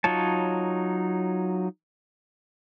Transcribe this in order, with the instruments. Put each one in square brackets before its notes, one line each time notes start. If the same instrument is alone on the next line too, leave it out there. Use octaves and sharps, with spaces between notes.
[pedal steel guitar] F#3 D#4 F4 C#5 A5